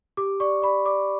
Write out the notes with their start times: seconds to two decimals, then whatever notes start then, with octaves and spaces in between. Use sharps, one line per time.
0.17 G4 D6
0.40 D5 C#6
0.62 D5 B5
0.86 D5 D6